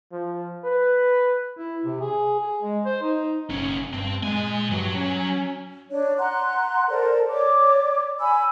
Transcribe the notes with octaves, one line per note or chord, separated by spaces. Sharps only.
F3
B4
E4
C3
G#4
G#4
G#3
C5
D#4
F#1 B1 C#4
G2 C4
A#2 G#3 G#5
G2 F#3 F#4
C#4
D4 C#5
F#5 A#5 C6 F#6
A4 A#4 C5 D5
C#5 D5 D6
G#5 B5 E6